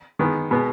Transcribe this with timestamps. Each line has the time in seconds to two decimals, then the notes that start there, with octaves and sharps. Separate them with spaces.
0.19 D#3 G#3 B3
0.51 B2 G#3 B3